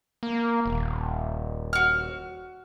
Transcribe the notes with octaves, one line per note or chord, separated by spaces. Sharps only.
A#3
D#1
F#4 F6